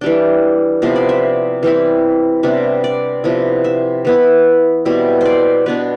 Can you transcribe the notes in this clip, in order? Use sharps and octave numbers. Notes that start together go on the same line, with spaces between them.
E3 G3 D4 G5
C3 F3 B3 E4 C5
D5
E5
E3 G3 C4 E4
C3 G3 B3 D4 E5
D5
C3 F3 B3 E4
E5
E3 B3 E4
B2 G3 C4 E4
C5 D5
B2 B3 D4 B4